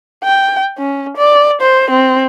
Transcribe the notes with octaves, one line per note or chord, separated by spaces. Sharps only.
G5
C#4
D5
C5
C4